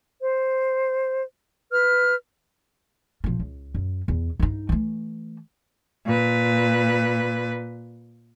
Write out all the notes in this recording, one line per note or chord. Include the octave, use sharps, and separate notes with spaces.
C5
B4 F6
B1 F3
C#2
F#2
E2
G2 D#4
E3 A3
A#2 B4